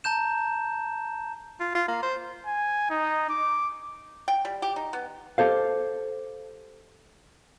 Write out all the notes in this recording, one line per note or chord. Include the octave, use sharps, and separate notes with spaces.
A5 A#5 G6 E7
F4
F4
A#3
C5
G#5
D#4
D6
G5
G3
G4
D#4
B3
G4 A4 C5 F5